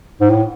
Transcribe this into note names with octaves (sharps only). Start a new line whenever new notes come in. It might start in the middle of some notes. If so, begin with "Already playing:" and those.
G#2
A2